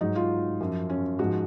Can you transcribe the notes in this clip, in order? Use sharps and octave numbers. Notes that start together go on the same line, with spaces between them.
G#2 F#3 D#4
F4
F#2 F3
C#4
G#2 F3 F#4